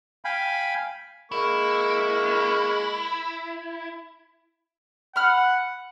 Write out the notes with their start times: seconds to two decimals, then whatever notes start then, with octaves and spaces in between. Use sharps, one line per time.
0.25 F5 G5 G#5 B5
1.32 G#3 A#3 E4 C#6
5.16 F#5 B5 F6